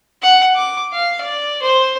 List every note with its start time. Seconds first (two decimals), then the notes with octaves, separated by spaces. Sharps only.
0.22 F#5
0.55 D6
0.92 F5
1.21 D5
1.62 C5